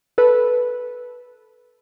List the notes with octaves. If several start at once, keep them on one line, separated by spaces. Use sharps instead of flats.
A4 B4